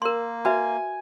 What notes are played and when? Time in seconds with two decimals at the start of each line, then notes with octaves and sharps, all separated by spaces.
0.02 A#3 A#4 C6
0.45 F#4 B4 E5 G#5